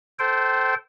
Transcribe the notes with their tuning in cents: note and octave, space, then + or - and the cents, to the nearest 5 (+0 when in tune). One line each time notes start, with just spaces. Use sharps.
A4 -10 C5 -5 G5 -30